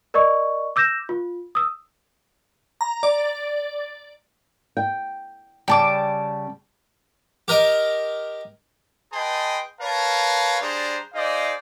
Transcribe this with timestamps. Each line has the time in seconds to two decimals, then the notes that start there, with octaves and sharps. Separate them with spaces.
0.14 A#4 D5 D#5 C#6
0.76 D6 E6 G6 A#6 E7
1.09 F4
1.55 D#6 E6
2.81 A#5
3.03 D5
4.77 G5
5.68 C#3 G3 G5 A5 D6
7.48 G4 A#4 D#5
9.13 G#4 B4 D#5 G5 A5 C6
9.80 A#4 B4 C#5 F5 A5
10.61 G3 D4 G#4 C5 D5 A#5
11.13 D#4 G#4 C5 D5 D#5 F5